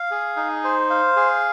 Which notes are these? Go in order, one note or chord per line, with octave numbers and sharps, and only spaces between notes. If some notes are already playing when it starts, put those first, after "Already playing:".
Already playing: F5
G#4
D#4
C5
F5
G#4